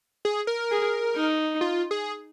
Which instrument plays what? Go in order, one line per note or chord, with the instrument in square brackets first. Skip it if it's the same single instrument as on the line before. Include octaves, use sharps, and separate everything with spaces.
[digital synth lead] G#4
A#4
[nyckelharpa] G#4
D#4
[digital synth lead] F4
G#4